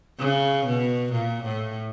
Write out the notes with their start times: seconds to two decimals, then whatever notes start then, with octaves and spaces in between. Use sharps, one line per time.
0.19 C#3
0.66 B2
1.12 A#2
1.43 A2